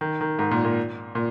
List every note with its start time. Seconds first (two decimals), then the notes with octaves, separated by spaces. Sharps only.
0.01 D#3
0.21 D#3
0.39 G#2
0.51 A#2
0.65 A#2
1.15 A#2